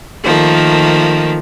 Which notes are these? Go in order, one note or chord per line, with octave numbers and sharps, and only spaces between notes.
D#3 F3 A3 A#3